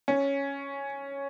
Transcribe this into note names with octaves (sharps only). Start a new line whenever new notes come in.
C#4